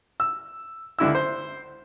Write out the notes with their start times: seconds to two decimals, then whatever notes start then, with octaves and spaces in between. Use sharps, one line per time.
0.20 E6
0.99 C#2 D3 E4 E6
1.15 C5